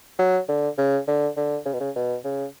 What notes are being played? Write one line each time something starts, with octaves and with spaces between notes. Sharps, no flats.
F#3
D3
C#3
D3
D3
C#3
B2
C#3
B2
C#3